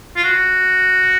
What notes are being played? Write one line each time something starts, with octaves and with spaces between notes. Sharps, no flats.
F4
F#4